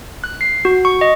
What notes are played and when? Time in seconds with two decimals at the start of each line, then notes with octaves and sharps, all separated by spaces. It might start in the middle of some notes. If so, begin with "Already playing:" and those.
0.24 F#6
0.41 C7
0.65 F#4
0.85 C#6
1.01 D#5